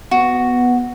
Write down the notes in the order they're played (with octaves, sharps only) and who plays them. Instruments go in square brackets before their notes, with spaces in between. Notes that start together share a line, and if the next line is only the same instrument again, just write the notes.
[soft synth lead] B3 [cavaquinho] F#4